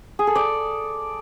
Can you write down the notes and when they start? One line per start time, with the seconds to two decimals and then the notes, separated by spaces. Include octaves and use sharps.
0.19 G#4
0.27 A4
0.35 D5